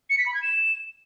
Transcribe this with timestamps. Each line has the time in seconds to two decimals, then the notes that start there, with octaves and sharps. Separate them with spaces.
0.10 C#7
0.18 B6
0.26 B5
0.34 G#6
0.43 E7